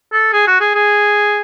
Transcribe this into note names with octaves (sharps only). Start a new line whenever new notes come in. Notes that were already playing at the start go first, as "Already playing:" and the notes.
A4
G#4
F#4
G#4
G#4